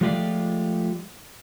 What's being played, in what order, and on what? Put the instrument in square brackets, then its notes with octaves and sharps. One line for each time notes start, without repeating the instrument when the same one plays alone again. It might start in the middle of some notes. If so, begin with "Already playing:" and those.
[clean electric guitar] F3 G#3 A3 F4 G4 D5